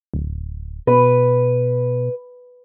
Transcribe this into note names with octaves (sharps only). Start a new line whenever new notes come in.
D1
B2 B4